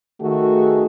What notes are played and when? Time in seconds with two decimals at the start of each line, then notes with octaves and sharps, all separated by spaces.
0.20 D#3 A3 F#4 G#4